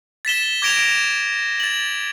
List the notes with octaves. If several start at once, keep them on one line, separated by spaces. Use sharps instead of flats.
A6 B6 E7 G7
D6 G#6 A#6 D7 E7 F7
A6 F#7